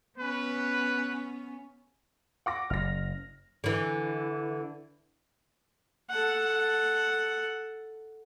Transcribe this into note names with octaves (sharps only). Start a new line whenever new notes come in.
B3 C#4 B4
F#5 D6 A#6
F#1 F6 A#6
D3 E3
A4 F#5